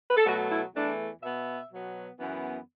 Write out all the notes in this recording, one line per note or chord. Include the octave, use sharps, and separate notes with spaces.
B4
A4
B2 F#3 A3 F#4
E4
E2 E3 A3 D4
B2 B3 E5
B2 F#3 B3
F#2 E3 B3